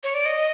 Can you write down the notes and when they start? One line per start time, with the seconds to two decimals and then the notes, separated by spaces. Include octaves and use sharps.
0.03 C#5
0.14 D5
0.26 D#5